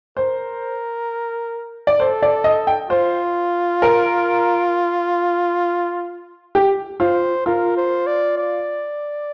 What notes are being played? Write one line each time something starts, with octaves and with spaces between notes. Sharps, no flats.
A#4 C5
D5
A4 C5
D5
D#5
G5
F4 C5
A#4
G4
F4 C5
F4 A#4
C5
D5
D5